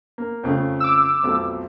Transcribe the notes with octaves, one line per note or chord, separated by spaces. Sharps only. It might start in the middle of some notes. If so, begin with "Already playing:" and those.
A#3
F2 C#3 A3
D6 E6
B1 F2 A3